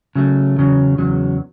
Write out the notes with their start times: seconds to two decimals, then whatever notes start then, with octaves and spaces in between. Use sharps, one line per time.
0.16 C#3 F#3 A3
0.57 E2 C#3 F#3
0.98 E2 C#3 F#3